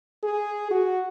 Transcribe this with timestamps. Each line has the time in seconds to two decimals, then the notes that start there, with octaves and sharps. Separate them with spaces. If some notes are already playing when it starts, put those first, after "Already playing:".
0.23 G#4
0.71 F#4